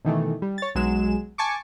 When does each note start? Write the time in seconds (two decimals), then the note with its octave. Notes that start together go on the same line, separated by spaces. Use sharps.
0.05 B2 D#3 E3 A3
0.42 G3
0.58 C#5 A6
0.75 B1 F#3 G#3 G#4 E7
1.38 G#5 A5 C#6 D6